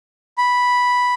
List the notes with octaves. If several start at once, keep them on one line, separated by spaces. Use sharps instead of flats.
B5